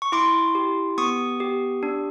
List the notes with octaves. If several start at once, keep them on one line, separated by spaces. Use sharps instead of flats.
C#6
E4 C6 D6
G4
B3 C#6 D#6
G4
D4